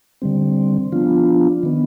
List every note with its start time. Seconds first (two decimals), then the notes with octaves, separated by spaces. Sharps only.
0.22 D3 G3 C4
0.92 F3 B3 D4 F4
1.63 D#3 B3